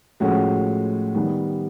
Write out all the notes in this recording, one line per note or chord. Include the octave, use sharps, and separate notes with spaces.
A2 F3 G#3 C#4 F#4
D#3 G3 B3